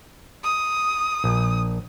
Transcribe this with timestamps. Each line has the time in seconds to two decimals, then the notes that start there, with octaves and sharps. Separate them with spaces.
0.44 D#6
1.24 A#1